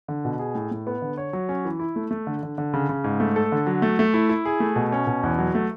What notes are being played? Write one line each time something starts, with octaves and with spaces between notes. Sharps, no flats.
D3
B2
G#4
A2
A2
B3
D3
C#5
F#3
C#4
E3
E4
A3
A3
D3
D3
D3
C#3
C#3
G#2
A3
A4
D3
F#3
A3
A3
E4
E4
G#4
A3
B2
C#4
B2
E2
F#3
A3